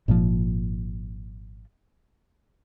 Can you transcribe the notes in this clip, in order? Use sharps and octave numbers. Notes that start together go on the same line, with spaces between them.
G#1 A#2 D#3 F3